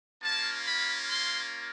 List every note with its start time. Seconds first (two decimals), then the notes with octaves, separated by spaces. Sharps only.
0.22 A#3 C#4 F4 A5
0.64 B5
1.07 C6